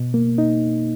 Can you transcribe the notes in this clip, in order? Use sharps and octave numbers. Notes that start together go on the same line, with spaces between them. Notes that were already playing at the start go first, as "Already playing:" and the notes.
Already playing: B2
A#3
D#4